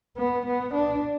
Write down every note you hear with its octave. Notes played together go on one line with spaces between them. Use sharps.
B3
B3
D4